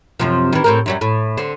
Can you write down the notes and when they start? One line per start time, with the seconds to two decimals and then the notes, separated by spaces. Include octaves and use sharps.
0.20 F#2 C3 F3
0.52 D#3 E3
0.64 A2 C4 A#4
0.86 F#2 F#3 G3
1.01 A2
1.37 D3 C4